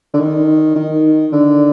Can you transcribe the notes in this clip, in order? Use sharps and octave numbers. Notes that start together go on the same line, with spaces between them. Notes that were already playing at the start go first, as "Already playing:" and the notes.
D3
D#3
D#3
D3